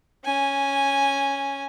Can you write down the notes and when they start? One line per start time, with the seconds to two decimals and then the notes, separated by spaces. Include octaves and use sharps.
0.25 C#4 G#5